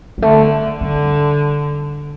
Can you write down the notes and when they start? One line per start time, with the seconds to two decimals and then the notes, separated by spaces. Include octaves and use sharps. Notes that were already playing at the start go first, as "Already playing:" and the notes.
0.18 G3
0.22 D3 A3
0.81 D3 G3